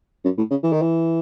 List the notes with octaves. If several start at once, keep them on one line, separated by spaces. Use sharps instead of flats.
F#2
A2
C#3
E3
D#3
E3